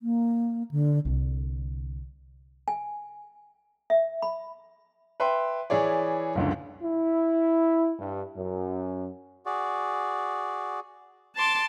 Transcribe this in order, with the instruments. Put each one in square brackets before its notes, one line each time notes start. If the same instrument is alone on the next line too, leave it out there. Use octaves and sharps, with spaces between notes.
[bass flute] A#3
D3
[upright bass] C2 D3
[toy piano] G#5
E5
B5
[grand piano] B4 E5 G5 C6
E3 E4 G#4 C#5 D5
F#1 C#2 D3
[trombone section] E4
G2
F#2
[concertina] F#4 G#4 D5
[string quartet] A5 C6 D6